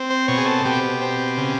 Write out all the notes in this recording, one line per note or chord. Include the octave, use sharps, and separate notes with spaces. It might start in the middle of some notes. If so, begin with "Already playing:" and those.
Already playing: C4
C5
B2 C#5
G#4
A4
B2 G4
C4
C#3